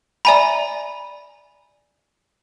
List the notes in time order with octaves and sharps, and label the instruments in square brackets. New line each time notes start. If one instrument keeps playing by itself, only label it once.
[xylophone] D5 E5 G#5 A#5 B5